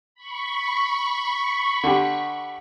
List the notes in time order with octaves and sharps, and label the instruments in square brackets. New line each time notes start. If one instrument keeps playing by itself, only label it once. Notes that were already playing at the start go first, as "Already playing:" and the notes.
[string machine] B5 C#6
[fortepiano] D3 G4